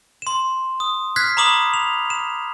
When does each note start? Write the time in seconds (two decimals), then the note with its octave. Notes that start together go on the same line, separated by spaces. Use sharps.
0.22 C6 E7
0.80 D#6
1.16 F6 F#6 G#6 B6 C7
1.37 A#5 B5 D6 D#6 F#7
1.74 F7
2.10 E7